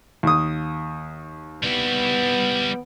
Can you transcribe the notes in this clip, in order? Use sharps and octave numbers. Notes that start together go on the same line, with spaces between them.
D#2 D#6
G3 B3 E4